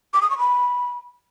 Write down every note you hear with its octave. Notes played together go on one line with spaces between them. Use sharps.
D6
D#6
C#6
B5